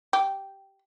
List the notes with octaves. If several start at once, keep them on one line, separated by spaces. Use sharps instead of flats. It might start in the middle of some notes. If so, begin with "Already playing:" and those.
G4